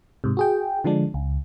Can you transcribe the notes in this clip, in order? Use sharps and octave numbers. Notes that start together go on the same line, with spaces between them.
G#2 C3
F#4 G#4 G5
D3 F3 G#3 D4
C#2